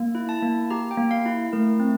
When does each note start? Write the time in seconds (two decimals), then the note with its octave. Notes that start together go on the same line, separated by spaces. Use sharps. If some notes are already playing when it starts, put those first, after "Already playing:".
Already playing: A#3
0.15 E4
0.29 A5
0.43 A#3
0.70 G4 A#5
0.91 G5
0.97 A#3
1.11 F5
1.26 E4
1.53 A3 A#4
1.80 C4